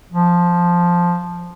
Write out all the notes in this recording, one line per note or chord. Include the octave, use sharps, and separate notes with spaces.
F3